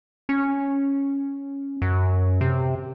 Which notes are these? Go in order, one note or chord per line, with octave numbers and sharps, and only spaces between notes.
C#4
F#2
C3